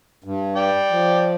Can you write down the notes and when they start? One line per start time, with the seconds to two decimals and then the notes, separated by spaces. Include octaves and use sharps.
0.24 G2
0.56 D5 G5
0.91 F3